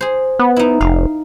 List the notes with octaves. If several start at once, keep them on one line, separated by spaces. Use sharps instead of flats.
G#4 C5
B3
D#4 E4
F1 F5